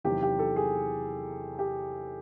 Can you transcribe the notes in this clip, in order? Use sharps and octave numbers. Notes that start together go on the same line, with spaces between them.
E2 C3 D#3 F#3 G4
G4
A4
G#4
G4